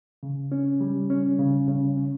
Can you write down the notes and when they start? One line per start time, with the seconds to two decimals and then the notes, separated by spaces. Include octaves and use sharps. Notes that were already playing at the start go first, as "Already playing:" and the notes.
0.23 C#3
0.52 C#4
0.81 G3
1.10 C#4
1.39 C#3
1.68 C#3
1.97 C#4